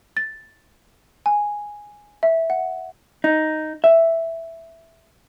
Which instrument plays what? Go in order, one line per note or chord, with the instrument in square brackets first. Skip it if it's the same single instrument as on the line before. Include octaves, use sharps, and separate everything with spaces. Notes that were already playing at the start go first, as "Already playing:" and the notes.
[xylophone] A6
G#5
E5
F#5
[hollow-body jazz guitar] D#4
E5